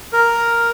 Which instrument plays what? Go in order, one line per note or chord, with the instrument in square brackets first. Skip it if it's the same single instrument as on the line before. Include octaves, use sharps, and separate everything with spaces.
[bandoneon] A#4